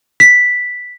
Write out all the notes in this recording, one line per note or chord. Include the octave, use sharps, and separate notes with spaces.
B6